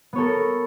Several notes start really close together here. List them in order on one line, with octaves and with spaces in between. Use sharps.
B3 C#5 A4 A#4